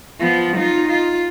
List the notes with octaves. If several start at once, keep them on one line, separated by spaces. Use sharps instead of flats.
F3 B3
D#4 F4
F4